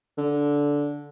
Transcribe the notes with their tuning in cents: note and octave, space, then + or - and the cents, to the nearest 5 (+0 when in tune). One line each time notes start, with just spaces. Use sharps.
D3 -10